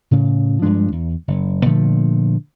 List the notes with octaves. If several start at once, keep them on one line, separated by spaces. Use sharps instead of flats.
A2 C#3
G2 F3 G#3 D4
E2
F#1
A#2 D3 F3 A3